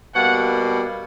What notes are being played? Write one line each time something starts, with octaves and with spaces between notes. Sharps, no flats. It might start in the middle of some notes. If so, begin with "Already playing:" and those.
B2 G3 A#3 F#5